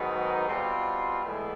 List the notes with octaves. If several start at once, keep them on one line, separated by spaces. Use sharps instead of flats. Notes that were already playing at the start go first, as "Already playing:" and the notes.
Already playing: G#2 D#3 F#3 B3 D#4
B2 G3 C4 F4
A2 E3 G#3 B3 E4